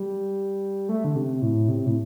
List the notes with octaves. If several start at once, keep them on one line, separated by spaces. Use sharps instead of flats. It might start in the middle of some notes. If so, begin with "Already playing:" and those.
Already playing: G3
A3
D3
C3
A2
C3
A2